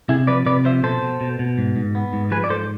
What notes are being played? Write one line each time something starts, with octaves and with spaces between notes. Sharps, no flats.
C3 E4 G#4
F3 B4 D5
C3 B4 D5
F3 C5 E5
B2 A4 C5
B2
B2
B2
G#2
G#2
B3
G#2
F3 G#4 B4
D5
G#2 A4 C5